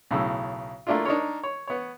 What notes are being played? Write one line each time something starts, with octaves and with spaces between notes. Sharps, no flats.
B1 A2 C#3 E6
A3 A#3 D4 E4 F4
D4 D#4 A#4 C#5
C#5
B3 C#5